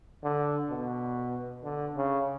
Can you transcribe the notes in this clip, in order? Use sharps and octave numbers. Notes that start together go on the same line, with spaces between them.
D3
B2
D3
C#3